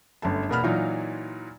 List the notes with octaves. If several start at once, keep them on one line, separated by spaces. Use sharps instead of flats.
G1 F#2 A3 A5
E2 B2 A#3 B3 B5 F6
A#2 E3 F#3 D#4 F4